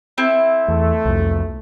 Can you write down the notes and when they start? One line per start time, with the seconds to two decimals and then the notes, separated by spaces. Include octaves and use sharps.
0.18 C4 E4 A4
0.68 E2 A3
1.05 C2 F2